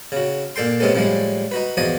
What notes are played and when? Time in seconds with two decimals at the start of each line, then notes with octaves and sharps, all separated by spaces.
0.12 C#3 F#4
0.56 A#2 D4 A4 G5 C6
0.80 C3 G#3 B3 C#4 A4
0.95 A2 F3 G3 G#3 D4
1.51 D#4 F#4 B4
1.77 E2 F3 F#4 D5 D#5 G#5